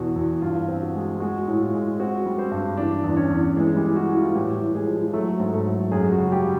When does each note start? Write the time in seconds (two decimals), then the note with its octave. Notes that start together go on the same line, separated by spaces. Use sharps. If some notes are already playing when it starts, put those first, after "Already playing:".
Already playing: E2 B2 F#4
0.16 E2
0.42 G2 F4
0.68 C4
0.82 F#4
0.95 G#3
1.20 G#3 F#4
1.48 A2
1.60 F4
1.74 G#3
1.99 C4 F#4
2.26 G3
2.38 C4 C5
2.51 G2
2.77 E3 D4 D5
3.04 E2
3.17 C#4 C#5
3.30 E2
3.57 E3 G#3 G#4
3.76 G3 G4
3.83 E3
3.96 F#4
4.08 E3
4.16 F4
4.35 A2 G3 G4
4.61 A2
4.74 G#3 G#4
4.87 F3
5.13 F#3 A3 A4
5.40 G#2
5.53 A3 A4
5.66 F#3
5.91 F#2 G#3 G#4
6.12 F#4
6.19 C#3
6.32 G3 G4
6.44 C#3